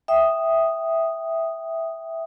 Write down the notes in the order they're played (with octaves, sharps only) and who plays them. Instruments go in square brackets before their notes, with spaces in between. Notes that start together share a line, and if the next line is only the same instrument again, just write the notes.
[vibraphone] E5 G5 D#6